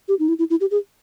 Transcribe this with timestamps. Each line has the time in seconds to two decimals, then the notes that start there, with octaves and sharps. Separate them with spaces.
0.08 G4
0.19 D#4
0.28 E4
0.39 E4
0.50 E4
0.61 G4
0.71 G#4